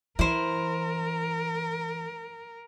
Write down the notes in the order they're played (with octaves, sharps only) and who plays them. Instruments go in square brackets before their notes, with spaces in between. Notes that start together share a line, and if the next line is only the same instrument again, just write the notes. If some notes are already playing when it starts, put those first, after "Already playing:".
[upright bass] E3 [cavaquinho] E4 C5 [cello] A#4